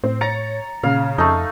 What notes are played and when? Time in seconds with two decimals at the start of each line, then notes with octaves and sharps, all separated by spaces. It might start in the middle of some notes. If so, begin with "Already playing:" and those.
0.04 A2 C4
0.21 C#5 A#5 A6 C#7
0.83 A#2 C#3 F5
1.18 F2 A3 D#4